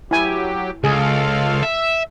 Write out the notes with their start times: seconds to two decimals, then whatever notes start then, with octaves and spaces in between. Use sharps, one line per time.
0.11 F#3 E4 G4 G#5
0.84 C#2 F4 G#4 A4 F5
1.63 E5